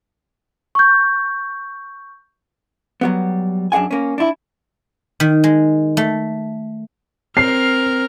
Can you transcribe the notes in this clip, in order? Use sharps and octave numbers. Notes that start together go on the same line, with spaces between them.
C#6 G6
F#3 G3 B3
F#2 D4 G#4 F#5 G#5
A#3 C#4
D4 E4
D#3
G#3
A3
C4 A#4 F6 C7